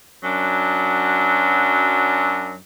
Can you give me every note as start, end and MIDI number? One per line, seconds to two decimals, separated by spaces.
0.23 2.55 42
0.23 2.55 54
0.23 2.55 62